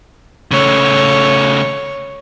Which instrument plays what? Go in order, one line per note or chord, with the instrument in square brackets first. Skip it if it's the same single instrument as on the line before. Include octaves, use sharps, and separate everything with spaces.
[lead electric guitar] C#3 A3 [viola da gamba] C#5